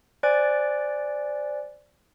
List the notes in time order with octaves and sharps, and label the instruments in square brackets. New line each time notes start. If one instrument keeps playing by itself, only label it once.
[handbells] C5 D5 G#5 F#6 A6 D7